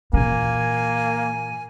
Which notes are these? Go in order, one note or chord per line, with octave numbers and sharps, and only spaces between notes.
A#2 E3 A#3 G#5